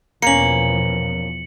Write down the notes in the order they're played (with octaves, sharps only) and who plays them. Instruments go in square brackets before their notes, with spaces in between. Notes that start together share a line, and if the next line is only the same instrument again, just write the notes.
[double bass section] E2 B2 F3 [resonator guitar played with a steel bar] A#3 C#4 [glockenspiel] C#7 F#7